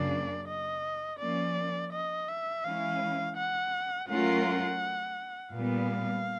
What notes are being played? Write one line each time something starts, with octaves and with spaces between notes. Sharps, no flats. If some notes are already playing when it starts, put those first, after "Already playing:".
Already playing: F#2 C#3 F#3 A#3 D4 D5
D#5
F3 A#3 C#4 D5
D#5
E5
E3 G#3 C#4 E4 F5
F#5
F#3 A3 C#4 F4 A#4 F#5
A#2 G3 B3 F5